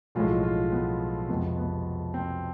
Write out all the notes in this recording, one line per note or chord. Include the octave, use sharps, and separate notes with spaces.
B1 A2 F3 G#3 F4
F4
B3
F2 C3 F3 G#3 B3
B3
C4